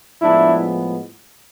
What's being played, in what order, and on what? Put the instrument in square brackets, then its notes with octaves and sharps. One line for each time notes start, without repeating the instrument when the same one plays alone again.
[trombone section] A2 F3 G#3 B3 D4 E4